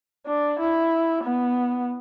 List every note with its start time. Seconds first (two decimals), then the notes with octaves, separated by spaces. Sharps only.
0.26 D4
0.59 E4
1.24 B3